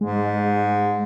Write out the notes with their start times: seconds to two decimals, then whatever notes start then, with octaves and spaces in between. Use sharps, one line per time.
0.01 G#2 G#3